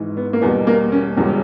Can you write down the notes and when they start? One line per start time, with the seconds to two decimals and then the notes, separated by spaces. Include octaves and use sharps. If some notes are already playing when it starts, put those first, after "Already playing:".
Already playing: G#1 G#2 E3 G#3
0.17 B3
0.33 A#3
0.42 E2 B2 G3 B3
0.67 A#3
0.92 C#4
1.17 E1 E2 C#3 G3